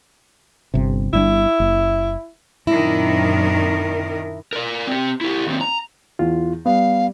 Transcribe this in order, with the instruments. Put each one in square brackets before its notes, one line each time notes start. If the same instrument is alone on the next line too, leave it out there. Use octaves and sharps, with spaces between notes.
[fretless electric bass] G1 C3
[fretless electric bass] G1 G3 D4 [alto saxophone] E4
[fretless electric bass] F#1
[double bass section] F#2 A#2 C4 [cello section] D#3 D4 A#4 [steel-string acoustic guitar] E4
[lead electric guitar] A#4 D5
C4 G4
E4 G4
D#2 C4
A#5
[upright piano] E2 [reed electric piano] F4
[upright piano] G3 [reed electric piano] B3 [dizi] F5